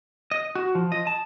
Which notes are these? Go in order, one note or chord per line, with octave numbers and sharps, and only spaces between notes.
D#5
F#4
F3
D#5
A5